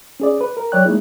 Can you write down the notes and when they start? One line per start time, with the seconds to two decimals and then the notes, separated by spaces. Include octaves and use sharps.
0.20 C#4 G#4 D5
0.41 B4
0.57 A#4
0.72 F#3 C#5 D5 G5 F#6
0.85 G#3 A#3 D#4 E4 G#4